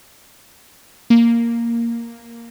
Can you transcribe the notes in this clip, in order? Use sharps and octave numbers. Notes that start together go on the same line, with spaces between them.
A#3